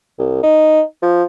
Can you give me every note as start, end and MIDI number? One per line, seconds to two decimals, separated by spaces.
0.19 0.43 36
0.43 0.81 63
1.02 1.24 53